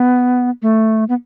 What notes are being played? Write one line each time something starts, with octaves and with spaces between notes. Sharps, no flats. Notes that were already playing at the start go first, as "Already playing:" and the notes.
Already playing: B3
A3
B3